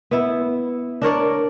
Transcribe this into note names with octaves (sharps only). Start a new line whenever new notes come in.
B3 E4
D4 A#4 C#5 D5